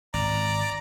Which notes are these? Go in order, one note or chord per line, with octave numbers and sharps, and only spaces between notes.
G#1 D5 A#5